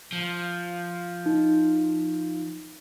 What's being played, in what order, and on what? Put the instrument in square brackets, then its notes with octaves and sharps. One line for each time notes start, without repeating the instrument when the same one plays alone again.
[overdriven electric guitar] F3
[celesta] D#4